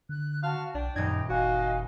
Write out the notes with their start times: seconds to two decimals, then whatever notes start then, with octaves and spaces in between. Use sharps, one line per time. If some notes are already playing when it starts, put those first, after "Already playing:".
0.09 D3 F#6
0.43 F#4 F5 A5
0.74 B1 D4 G5
0.96 D#1 F#2 D#4 G#6
1.30 F#1 F#4 D#5 F5 G#5